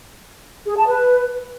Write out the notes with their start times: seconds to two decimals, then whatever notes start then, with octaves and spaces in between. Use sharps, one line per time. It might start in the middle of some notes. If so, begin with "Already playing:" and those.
0.66 G#4
0.77 A5
0.87 B4